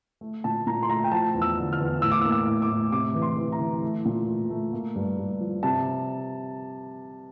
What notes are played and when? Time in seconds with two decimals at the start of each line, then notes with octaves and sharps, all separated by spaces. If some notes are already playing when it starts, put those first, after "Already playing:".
0.21 A3
0.44 A#2 A5
0.67 A#2 A#5
0.83 C6
0.89 A3 A#5
1.04 G5
1.12 F3 A5
1.34 E2
1.42 E6
1.57 D3
1.73 F6
1.80 E2
2.02 A2 E6
2.12 D6
2.21 E6
2.25 A#3
2.32 E6
2.47 A2
2.62 D6
2.69 A2
2.92 C3 D6
3.15 E3
3.22 C6
3.37 E3
3.52 A#5
3.60 E3
3.82 A3
4.05 A#2
4.27 A3
4.50 A3
4.73 A#3
4.95 G2
5.18 G2
5.40 F3
5.63 C3 A5